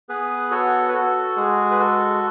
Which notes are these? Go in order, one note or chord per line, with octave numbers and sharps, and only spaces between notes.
B3 G#4 B4
F#4 A4 C#5
B4
F#4 A4
G#3 G#4
B4
F#4 A4